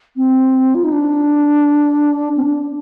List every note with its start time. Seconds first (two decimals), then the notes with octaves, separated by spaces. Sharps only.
0.16 C4
0.75 F4
0.84 D#4
0.92 D4
2.37 C4
2.44 D4